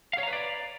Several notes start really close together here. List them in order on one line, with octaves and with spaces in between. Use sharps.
F5 C#5 A#5 B4 D5